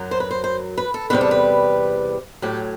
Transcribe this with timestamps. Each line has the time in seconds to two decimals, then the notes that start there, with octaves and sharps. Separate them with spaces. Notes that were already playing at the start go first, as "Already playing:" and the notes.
Already playing: F#2 F#3
0.11 C5
0.20 B4
0.31 C5
0.44 C5
0.78 B4
0.94 A4
1.10 E2 C3 G3 B4
1.21 A4
1.31 B4
2.42 A2 F#3 G4